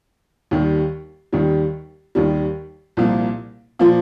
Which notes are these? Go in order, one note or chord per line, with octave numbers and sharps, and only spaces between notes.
D#2 D#3 G3
D#2 D#3 G3
D#2 D#3 G3
C2 A#2 F3 A#3 F4
A#2 F3 A#3 F4